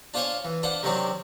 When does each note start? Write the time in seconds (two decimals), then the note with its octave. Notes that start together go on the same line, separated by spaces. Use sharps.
0.14 D4 F4 C5 C#5 F5 G#5
0.45 E3
0.63 D4 F4 C5 F#5
0.83 C3 D#3 F#3 C4 D4